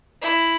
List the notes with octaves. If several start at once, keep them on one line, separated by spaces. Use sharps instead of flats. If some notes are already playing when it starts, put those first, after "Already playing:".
E4